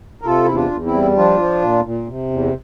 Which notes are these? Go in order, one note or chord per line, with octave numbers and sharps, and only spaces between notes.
A#4
C3 F4 A4
E2 E4
D4 F4
E2
C4 E4
G3
F3 D4 F4
F3
A#2
A#2
C3
E2